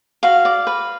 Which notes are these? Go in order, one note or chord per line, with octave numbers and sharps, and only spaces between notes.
F#4 F5
D5
B4